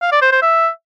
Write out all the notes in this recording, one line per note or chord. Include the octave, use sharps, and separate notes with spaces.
F5
D5
C5
C5
E5